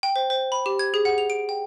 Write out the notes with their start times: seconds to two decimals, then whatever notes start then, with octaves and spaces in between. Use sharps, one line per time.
0.03 G5
0.16 C5
0.30 C5
0.52 B5
0.66 G4
0.79 G#6
0.94 G#4
1.05 F#5
1.18 F7
1.30 D7
1.49 G5